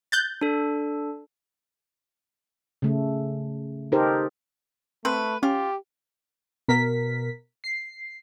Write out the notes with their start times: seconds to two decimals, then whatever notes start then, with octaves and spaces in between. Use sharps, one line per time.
0.12 F#6 G6 A6
0.41 D4 A4
2.82 C#3 A3
3.92 D#4 G4 A4 A#4 C5
5.05 A3 C4 B4
5.43 C#4 F4 G4
6.68 B2 A#4 B6
7.64 C7